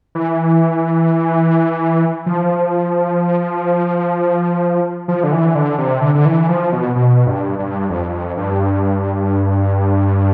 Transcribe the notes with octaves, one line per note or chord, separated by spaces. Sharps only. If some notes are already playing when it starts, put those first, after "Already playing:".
E3
F3
F3
D3
E3
D3
C3
D3
D3
E3
F3
B2
B2
G2
G2
F2
G2